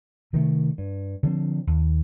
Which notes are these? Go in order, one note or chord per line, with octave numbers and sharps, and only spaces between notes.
C3 D#3 A3
G2
D3 F3 C4
D#2